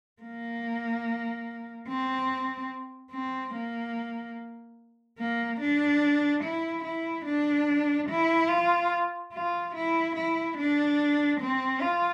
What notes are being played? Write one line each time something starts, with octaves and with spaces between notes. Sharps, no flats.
A#3
C4
C4
A#3
A#3
D4
E4
E4
D4
E4
F4
F4
E4
E4
D4
C4
F4